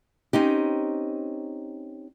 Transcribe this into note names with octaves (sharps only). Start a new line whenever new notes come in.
C4 C#4 D#4 G4